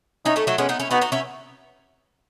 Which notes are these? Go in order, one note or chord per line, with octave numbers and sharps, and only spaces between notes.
C#4 D#4 E4
A3 C#4
F#3 A3
G#3 B3 C#4
B3 D#4
C#4 E4
B3 D#4 F#4
D#4 F#4
C#4 E4